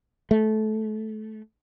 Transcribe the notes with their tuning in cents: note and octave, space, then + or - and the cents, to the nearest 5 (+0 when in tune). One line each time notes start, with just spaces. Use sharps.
A3 -20